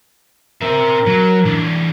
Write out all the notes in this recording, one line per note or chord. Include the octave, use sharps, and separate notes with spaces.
C4 A#4 E5
F#3
E3 D4